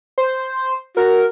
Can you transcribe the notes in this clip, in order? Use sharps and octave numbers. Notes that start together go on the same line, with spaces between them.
C5
F#4 A#4